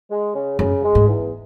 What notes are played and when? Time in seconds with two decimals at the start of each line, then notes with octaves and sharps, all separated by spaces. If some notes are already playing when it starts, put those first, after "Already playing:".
0.10 G#3
0.34 C#3
0.59 F#2 C#3
0.83 G#3
0.95 G#2
1.08 E2